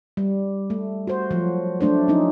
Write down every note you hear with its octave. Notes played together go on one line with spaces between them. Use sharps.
G3
A3
F#4 C5
F3 F#3
F#3 A3 D4 C5
F3 F#3 C#4 D#4